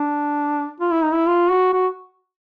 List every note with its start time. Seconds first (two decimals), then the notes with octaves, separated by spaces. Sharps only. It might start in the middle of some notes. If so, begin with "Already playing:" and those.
Already playing: D4
0.80 F4
0.92 E4
1.02 D#4
1.13 E4
1.27 F4
1.50 F#4
1.73 F#4